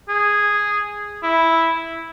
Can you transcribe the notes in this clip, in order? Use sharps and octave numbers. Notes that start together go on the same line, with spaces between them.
G#4
E4